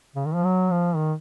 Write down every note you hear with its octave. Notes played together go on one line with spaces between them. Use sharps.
C#3
D#3
F3
F#3
F3
D#3